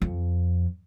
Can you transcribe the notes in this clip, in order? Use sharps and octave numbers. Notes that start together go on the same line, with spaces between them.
F2